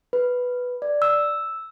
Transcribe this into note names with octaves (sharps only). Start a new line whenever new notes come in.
B4
D5
E6